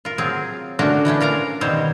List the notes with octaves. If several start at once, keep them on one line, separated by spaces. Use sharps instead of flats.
F4 A#4
F#3 C4 F4 G#4
D3 A3 C#4 D4 F#4 A#4
E3 A3 C#4 D4
F4 A#4 F5 A#5
B2 D#3 G3 C4 C5 C#5